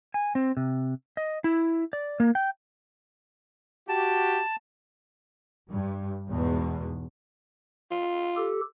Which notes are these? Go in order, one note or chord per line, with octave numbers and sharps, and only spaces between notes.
G#5
C4
C3
D#5
E4
D5
A#3
G5
F#4 G4 A5
G2
E2 G#2 B2
F4
G4 A4